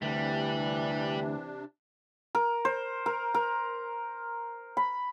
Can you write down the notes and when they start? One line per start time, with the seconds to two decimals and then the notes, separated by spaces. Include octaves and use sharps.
0.02 D2 C3 E3 G3 D4
2.35 A#4
2.65 C5
3.06 A#4
3.34 A#4
4.77 B5